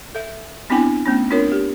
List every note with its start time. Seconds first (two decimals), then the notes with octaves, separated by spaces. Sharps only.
0.15 A4 E5
0.70 B3 C4 D4 E4 G5 G#5
1.06 A3 B3 C#4
1.31 C4 D4 F4 A#4 C#5
1.52 G4